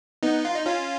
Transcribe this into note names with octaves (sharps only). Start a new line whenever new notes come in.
B3 D#4
F4
D#4
C#4 F4